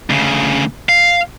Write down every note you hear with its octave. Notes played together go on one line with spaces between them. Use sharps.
D2 C#3
F5